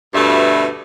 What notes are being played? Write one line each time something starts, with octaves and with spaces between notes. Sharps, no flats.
D2 G2 B2 A3 B4 E5